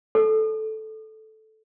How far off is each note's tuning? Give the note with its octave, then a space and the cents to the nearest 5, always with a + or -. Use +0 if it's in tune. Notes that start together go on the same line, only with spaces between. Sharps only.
A4 -10